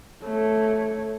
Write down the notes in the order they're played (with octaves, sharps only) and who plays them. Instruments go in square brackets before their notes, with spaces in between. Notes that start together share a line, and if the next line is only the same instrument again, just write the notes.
[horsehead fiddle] A3 C#5